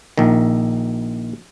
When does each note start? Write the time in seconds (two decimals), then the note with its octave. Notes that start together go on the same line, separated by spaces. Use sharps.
0.18 A#1 D#3